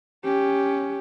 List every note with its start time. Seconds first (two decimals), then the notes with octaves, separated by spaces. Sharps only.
0.24 C#4 G4